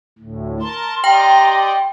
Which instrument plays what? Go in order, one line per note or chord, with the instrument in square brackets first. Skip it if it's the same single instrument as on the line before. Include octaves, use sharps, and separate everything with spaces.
[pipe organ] D2 A2
[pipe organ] A#4 A5 [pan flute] C6
[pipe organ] G4 D5 D#5 [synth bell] G5 [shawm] A#5